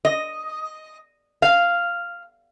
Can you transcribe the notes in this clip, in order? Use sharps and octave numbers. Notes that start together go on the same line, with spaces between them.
D#5
F5